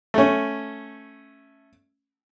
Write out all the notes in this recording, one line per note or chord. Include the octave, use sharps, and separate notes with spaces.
A3 C#4